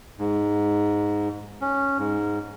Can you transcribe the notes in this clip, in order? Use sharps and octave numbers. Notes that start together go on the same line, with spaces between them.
G#2
C#4
G#2